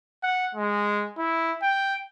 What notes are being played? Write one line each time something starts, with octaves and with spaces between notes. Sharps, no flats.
F#5
G#3
E4
G5